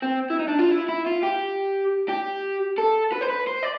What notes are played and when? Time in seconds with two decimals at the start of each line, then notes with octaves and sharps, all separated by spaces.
0.02 C4
0.30 E4
0.40 D#4
0.48 D4
0.59 F4
0.71 E4
0.89 E4
1.06 F4
1.23 G4
2.09 G4
2.78 A4
3.12 B4
3.21 C5
3.29 B4
3.47 C5
3.63 D5